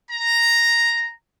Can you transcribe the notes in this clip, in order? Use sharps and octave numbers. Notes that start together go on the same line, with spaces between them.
A#5